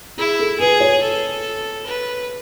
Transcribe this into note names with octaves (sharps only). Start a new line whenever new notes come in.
E4 G#4
A4
G#4 B4
C#5
A4
B4